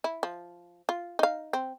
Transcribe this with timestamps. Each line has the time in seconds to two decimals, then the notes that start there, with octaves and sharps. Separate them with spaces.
0.04 E4
0.23 F3
0.89 F4
1.19 D#4 F5
1.53 C4